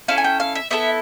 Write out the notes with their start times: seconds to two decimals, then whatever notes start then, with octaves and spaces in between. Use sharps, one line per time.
0.08 C#4 E4 A4 F5
0.18 G#5
0.24 G5
0.40 F5
0.55 E5
0.70 B3 E4 A4 E5